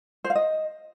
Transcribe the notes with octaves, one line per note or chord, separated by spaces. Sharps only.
C5
F5
D#5